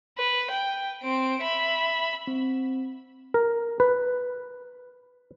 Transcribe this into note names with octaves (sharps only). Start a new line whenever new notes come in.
B4
G5
C4 D7
E5 B5
C4
A#4
B4